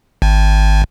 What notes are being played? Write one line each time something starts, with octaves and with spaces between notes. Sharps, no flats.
G#1